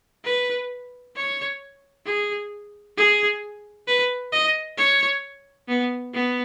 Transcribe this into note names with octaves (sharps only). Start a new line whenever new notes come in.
B4
C#5
G#4
G#4
B4
D#5
C#5
B3
B3